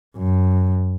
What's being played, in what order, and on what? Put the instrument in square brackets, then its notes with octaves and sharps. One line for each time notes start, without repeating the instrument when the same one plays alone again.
[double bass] F#2